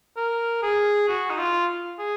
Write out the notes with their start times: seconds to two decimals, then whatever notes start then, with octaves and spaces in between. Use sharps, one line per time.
0.17 A#4
0.63 G#4
1.08 F#4
1.30 D#4
1.38 F4
1.99 G#4